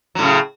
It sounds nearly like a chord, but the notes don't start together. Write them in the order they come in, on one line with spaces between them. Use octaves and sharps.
F#3 A2 C#3